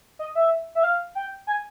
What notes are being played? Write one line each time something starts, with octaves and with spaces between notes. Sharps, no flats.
D#5
E5
E5
F5
G5
G#5